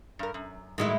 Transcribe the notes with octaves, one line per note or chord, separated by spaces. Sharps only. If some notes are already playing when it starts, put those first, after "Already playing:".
G2 A#4
F#2
A2 D#3 F#3 G#3 E4